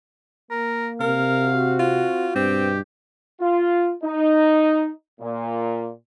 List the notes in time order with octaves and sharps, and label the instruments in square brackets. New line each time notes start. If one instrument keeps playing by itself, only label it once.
[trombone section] A#3 [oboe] A#4
[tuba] C3 [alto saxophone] A#4 [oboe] F5
[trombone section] C4 F#4
[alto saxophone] F4
[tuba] G2 [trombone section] B2 [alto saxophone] C4 [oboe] G4
[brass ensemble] F4
D#4
A#2